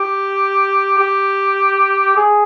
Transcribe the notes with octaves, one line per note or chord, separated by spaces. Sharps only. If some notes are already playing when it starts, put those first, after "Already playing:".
Already playing: G4
G4
G#4